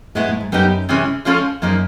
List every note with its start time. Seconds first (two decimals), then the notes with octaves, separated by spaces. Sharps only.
0.15 A2 G#3 B3 E4
0.28 A2
0.40 G#2
0.52 F#2 G3 B3 D#4 G4
0.89 C3 E3 G#3 C#4
1.25 F3 G#3 C#4 F4 A4
1.62 F#2 F3 A#3 D#4 G#4